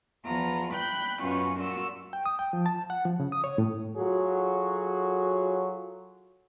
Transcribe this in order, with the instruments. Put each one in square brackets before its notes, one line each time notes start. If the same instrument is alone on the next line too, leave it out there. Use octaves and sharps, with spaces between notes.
[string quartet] E2 F3 B3 A#5
G5 B5 F#6 G6
F#2 B2 C#4 F4 C#6
A#2 F4 F#4 E6
[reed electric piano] G5
D#6
G5
F3
A5
F#5
F3
C#3
D#6
C#5
A2
[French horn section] F#3 F4 F#4 G#4 A4 C#5